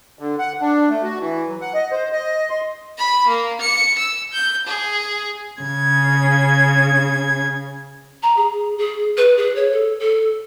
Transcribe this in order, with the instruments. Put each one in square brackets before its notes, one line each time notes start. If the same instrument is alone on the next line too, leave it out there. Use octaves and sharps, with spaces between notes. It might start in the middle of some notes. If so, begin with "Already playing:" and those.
[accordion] D3
F#5
D4
A3
F#4
E3
F#3
F#5
D#5
C5
D#5
C6
[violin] B5
A#3
C#7
E6
G6
G#4
[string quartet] C#3 G#6
[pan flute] A#5
G#4
G#4
B4
G#4
C#5
A4
A4